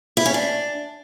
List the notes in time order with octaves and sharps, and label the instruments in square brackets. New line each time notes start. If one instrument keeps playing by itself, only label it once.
[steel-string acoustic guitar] E4
C#4
D4